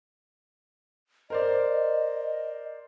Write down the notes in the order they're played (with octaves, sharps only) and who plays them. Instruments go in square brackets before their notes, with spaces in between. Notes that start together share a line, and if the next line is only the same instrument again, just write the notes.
[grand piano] A#4 C5 D5 [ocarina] D#5